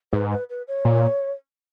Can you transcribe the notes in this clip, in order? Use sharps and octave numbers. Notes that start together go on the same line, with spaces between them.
G#2 B4
B4
B4
C#5
A#2